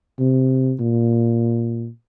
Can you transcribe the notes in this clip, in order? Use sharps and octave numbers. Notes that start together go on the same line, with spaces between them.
C3
A#2